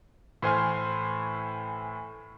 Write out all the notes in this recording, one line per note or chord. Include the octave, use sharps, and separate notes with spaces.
A2 E3 C5 G#5 C6 F6